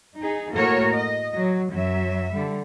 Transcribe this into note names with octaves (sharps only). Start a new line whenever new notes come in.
D#4 G#4
A2 A3 A#3 F#4 A#4 C#5
D#5
F#3
F#2 F#3 E5
D3 G3